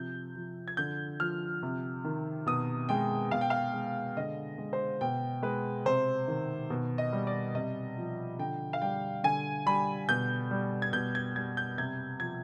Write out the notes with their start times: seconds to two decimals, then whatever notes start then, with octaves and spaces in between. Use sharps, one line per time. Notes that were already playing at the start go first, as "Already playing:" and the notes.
Already playing: C3 F3 G6
0.36 F3
0.68 G#6
0.77 D3 G6
1.20 F3 F6
1.63 C3
2.05 D#3
2.46 B2 D#6
2.89 G#3 G5
3.31 B2 F5
3.41 G5
3.50 F5
3.73 G#3
4.17 D3 D#5
4.58 G#3
4.73 C5
5.01 B2 G5
5.43 G#3 B4
5.86 C3 C5
6.28 D#3
6.70 B2
6.98 D#5
7.13 G3
7.27 D5
7.55 C3 D#5
7.98 F3
8.39 D3 G5
8.73 F5
8.82 G3 G5
9.24 D3 G#5
9.66 G3 B5
10.09 B2 G6
10.51 G3
10.82 G#6
10.93 B2 G6
11.15 G#6
11.36 G3 G#6
11.57 G6
11.78 C3 G#6
12.20 F3 G#6